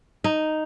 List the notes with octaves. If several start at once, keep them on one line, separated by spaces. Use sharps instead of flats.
D#4